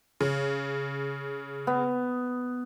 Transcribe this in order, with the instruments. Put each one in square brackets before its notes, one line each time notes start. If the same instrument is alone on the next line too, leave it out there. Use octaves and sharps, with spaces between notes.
[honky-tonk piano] C#3
[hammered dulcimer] B3